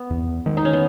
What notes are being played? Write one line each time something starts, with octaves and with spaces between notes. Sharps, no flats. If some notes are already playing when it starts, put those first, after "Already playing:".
Already playing: B3
E2
D#3 G#3
D#4
C#4
B3